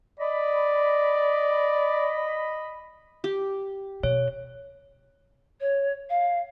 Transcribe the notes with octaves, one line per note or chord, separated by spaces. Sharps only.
D5 D#5 B5
G4
B2 C#5
C#5
F5